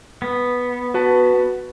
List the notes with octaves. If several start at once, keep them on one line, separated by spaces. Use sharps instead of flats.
B3
F#4 B4 A5